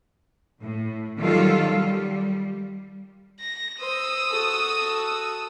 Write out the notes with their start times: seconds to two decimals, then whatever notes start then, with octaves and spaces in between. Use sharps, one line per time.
0.62 A2
1.19 D#3 F#3 G3 F4 A4
1.69 G3
3.40 A#6
3.80 C5 D#6 E6
4.31 F#4 A4